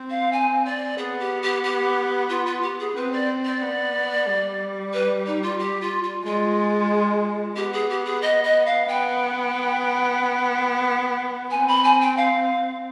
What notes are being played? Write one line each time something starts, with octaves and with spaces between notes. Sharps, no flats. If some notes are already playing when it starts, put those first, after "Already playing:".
Already playing: C4
F5
G#5
D5
B3 G#4
G4
G4
G4
F4
F4
G4
G#4
C4 B4
D5
D5
B3
G3
B4
D#4
F4
G4
F4
F4
G#3 F4
B3 G4
G#4
G4
G#4
D#5
D#5
F5
B3 G5
C4 G#5
B5
G#5
G5
F5